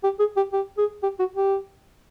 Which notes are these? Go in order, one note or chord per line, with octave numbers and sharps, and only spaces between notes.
G4
G#4
G4
G4
G#4
G4
F#4
G4